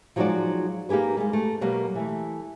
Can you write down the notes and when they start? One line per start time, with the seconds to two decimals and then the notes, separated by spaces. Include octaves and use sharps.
0.16 F3 F#3 G#3 D#4 F#4 D5
0.89 A#3 D#4 G4 G#4 B4
1.17 G3 G#3
1.33 A3
1.61 B2 F#3 G3 A#3
1.95 E3 A3